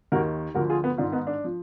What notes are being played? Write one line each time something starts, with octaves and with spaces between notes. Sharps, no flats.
D#2 D#3 F#4 A#4
D2 D3 F3 F#4 A#4
F4 G#4
B3
G#2 D#3 D4 F4
B3 D#4
D4
F3